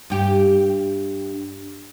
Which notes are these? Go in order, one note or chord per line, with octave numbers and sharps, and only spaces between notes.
G2 G4